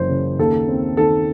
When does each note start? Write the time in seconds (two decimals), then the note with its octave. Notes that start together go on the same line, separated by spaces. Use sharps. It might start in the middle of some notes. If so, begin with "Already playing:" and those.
Already playing: F#1 F#2 E3 C5
0.09 C#3
0.39 D#2 A4
0.68 C4
0.97 D#3 A4